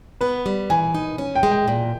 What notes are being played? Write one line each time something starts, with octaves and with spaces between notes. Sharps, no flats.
B3 B4
G3
E3 G#5
D#4
C#4
G5
G#3
G5
A#2